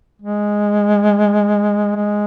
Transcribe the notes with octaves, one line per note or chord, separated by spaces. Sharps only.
G#3
G#3